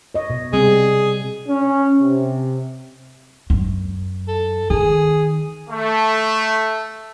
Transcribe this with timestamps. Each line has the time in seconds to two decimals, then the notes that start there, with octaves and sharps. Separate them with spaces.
0.14 C#5 D#5
0.30 B2
0.53 C3 G3 C4 G#4
1.48 C#4
1.99 C3
3.50 F#2
4.28 A4
4.70 D#3 G#4
5.69 A3